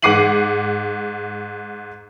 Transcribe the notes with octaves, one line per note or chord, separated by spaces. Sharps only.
G#2 F#5 D6 C7 D#7 F#7